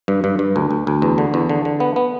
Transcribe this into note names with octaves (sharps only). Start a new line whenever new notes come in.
G2
G2
G2
D2
D2
D2
E2
D3
E2
D3
D3
B3
B3